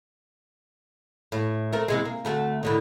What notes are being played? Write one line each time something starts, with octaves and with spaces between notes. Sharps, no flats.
A2
A3 C4 A#4
E2 C3 G#3
A#3
D2 A3 F#4
A2 D3 D#3